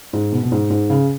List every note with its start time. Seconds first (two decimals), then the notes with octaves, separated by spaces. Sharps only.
0.13 G#2
0.32 B2
0.43 B2
0.52 G#2
0.70 G#2
0.90 C#3